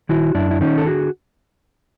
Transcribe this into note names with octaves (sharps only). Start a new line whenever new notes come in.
D#3 E4 F#4
F#2 D4 E4
E4
D#3 C#4 D#4
A4
D3 F#4 G#4